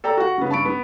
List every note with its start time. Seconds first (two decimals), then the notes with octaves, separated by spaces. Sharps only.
0.04 A4 D5 G5 A#5
0.17 F#4 F#5
0.38 C#3 B3
0.49 G2 A5 B5 C#6 D7
0.65 B3